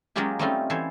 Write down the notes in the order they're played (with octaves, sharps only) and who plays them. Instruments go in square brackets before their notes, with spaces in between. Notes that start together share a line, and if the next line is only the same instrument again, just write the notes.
[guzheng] F#3 G#3 A#3 C#4 F4 G4
G3 A3 C4 C#4 D#4 F4
E3 A4 C5 C#5